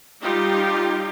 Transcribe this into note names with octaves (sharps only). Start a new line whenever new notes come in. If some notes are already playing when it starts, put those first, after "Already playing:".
G3 D#4 F4 G4